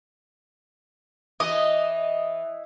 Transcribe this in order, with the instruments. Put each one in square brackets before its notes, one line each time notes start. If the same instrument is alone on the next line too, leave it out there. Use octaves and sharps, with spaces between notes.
[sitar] E3 [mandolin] D#5